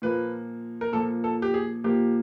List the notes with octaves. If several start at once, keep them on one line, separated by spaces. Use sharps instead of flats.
A#2 F3 A#3 B4
A#4
A#2 F3 A#3 A4
A4
G4
G#4
A#2 F3 A#3 G4